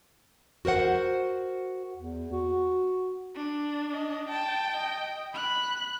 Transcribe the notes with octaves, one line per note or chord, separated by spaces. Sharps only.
F#4 A#4 C5 F#5
E2
F#4
D4
D#5
G5 A5
D#5
B5 F#6